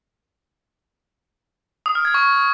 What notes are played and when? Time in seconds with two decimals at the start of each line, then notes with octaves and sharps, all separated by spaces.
1.86 D#6
1.95 F6
2.05 G#6
2.14 C#6